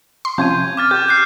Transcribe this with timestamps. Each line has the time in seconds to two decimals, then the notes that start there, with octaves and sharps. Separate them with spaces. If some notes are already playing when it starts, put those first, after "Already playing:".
0.25 C6
0.38 C3 F3 C#4 G6 G#6 D#7
0.77 D6 F6 A6
0.91 G4 G6
1.08 F#6 G6 C7